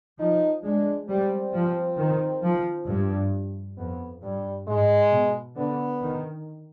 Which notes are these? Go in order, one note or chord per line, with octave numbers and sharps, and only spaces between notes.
F3 D#4
G#3 D4
G3 C4
F3
D#3
F3
G2
F2 B3
G2 G3
G#2 G#3
B2
D3 B3
D#3